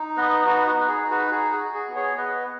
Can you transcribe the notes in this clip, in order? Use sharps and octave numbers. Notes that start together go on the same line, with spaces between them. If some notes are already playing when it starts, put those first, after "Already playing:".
Already playing: D#4
B3 B4 D#5
D#4 F#4 B4
F#4 B4
D#4
G#4
D#4
F#4 B4
F#4 G#4
G#4
F#4
G#4
B3
G#4 C#5
B3 B4 D#5